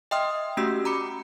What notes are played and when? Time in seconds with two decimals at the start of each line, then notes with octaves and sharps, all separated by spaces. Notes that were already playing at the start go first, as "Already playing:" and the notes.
0.11 D#5 E5 G5 C6 D#6 F6
0.57 A3 C#4 F#4 G4 E6 B6
0.85 A#5 B5 D6 C#7